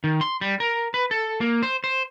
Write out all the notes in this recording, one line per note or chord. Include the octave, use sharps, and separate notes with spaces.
D#3
C6
G3
A#4
B4
A4
A#3
C5
C5